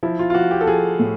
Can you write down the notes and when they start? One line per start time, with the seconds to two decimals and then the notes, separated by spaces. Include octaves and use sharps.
0.03 F3 E4
0.19 F4
0.30 F4
0.34 F3 F#4
0.51 G4
0.61 A4
0.67 F3 G#4
0.99 A2